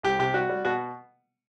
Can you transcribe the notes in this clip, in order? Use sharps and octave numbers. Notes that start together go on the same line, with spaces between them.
C2 G4
C3 G4
G3 F#4
G3
B2 F#4